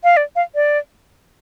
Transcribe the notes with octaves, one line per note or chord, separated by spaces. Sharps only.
F5
D5
F5
D5